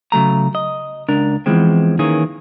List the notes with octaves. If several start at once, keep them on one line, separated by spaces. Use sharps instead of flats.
C#3 F#3 A3 A#5
D#5
C#2 D4 A#4
E2 G#2 E3 F3 G#3 C4
D#3 E3 A#3 C#4 G#4